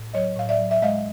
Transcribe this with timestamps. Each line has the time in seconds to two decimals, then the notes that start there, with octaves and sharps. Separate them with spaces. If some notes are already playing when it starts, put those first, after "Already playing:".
Already playing: A2
0.14 F#3 C#5 D#5
0.37 A2 F5
0.49 D5 E5
0.59 F#3
0.71 E5
0.82 G#3 D#5 F5